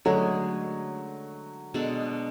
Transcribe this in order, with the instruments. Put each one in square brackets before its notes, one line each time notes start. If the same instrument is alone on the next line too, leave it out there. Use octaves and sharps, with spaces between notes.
[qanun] D3 G#3 C#4 G#4 [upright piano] F#3 A3
[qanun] B2 G#3 D4 A4